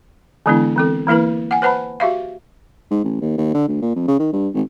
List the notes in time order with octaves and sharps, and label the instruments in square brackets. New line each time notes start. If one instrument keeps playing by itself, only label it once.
[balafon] D3 E3 G#3 B3 D4 E4
E3 C4 A4
E3 A#3 E4 A#4 B4
F#5 G#5
B4 C5 F#5 A5 B5
F#4 G4 E5 F5
[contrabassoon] G#2
A1
D#2
D#2
D3
D2
A#2
F2
C#3
D#3
G2
G#1